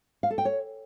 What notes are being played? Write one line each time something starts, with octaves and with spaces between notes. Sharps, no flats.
F5
A4
G5
C#5